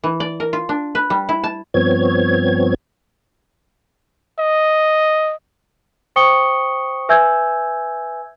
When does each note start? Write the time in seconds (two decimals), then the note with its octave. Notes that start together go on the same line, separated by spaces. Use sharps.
0.04 E3
0.20 D5
0.40 A#4
0.53 F4
0.69 D4
0.95 B4
1.10 G3
1.29 E4
1.44 A5
1.74 G2 F3 B3 C4 C#5 G#6
4.39 D#5
6.16 C5 G5 C#6 D#6 C#7 G7
7.09 B4 E5 G#5 E6 G6 G#6